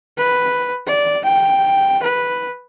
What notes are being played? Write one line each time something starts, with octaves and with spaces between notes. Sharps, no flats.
B4
D5
G5
B4